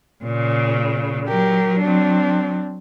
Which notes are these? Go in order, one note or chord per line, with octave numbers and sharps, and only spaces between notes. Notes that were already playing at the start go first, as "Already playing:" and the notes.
A#2 C#3
F#3 G4 A#4
C4 D4